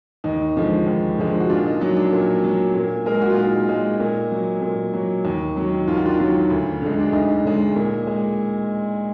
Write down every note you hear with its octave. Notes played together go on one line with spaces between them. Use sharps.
D#2 D#4
D3 F3 G#3
D#2
D3 F3 G#3
F#4
A#2 D4 F4
D#4
F#3 D#4
D4
A#2
F#3
A#2
G#3 A#4
G#4
F#4
F4
A#2 D#4
G#3
A#2
F#3
A#2
F#3
D#2
D#3 F#3
D#2 F4
F#4
D4 F4
D#3 F#3
D2
D3 G#3
D4
D2 D#4
D3 G#3
A#2
G#3